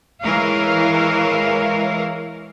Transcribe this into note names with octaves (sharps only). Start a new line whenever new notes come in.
E3 G#3 E4 A#4 C#5 F5